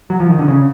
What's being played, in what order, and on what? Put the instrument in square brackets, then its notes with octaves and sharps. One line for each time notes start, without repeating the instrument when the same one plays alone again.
[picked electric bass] F#3
F3
D#3
D3
C#3